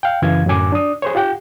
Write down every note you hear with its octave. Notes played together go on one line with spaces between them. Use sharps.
F5 G5
F#2 C#3 E3 F5 G#6
F#2 A2 D3 F#3 G#5 D6
D4 D5 D#6
G#4 C5 C#5
F4 G4 F#5 G5